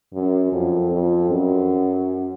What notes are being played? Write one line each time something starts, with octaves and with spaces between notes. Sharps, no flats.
F#2
F2
F2
F#2